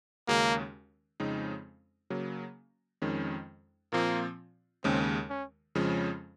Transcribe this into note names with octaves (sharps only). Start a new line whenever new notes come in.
D#2 C#3 G#3 A#3 C#4 F#4
F2 C#3 G#3 C4 D#4
C#3 F#3 A#3
F2 D#3 G#3 C#4
A#2 F3 A#3 C4 F4
D#2 C#3 G#3 C4 C#4
C#4
F2 C#3 F3 G#3 C#4